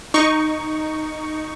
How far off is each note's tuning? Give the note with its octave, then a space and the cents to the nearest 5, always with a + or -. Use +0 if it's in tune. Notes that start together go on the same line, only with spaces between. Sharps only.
D#4 +0 C#6 +10